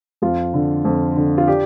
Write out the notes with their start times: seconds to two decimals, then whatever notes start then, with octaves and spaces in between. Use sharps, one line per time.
0.22 F2 F4
0.54 D3
0.85 F2
1.16 D3
1.38 F4
1.47 D4 G4